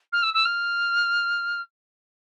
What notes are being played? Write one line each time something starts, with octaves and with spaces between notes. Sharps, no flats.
F6
E6
E6
F6